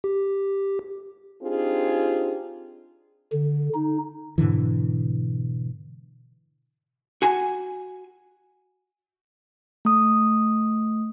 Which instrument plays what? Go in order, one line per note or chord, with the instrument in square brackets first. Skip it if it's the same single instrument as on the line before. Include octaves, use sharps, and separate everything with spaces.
[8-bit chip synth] G4
[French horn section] C4 D4 D#4 F4 G4 G#4
[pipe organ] D3
D#4
[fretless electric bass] G#2 B2 D3 E3
[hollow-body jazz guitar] F#4 G#5
[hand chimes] A3 D#6